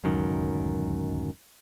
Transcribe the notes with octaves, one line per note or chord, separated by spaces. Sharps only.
D1 C#2 F#2 D#3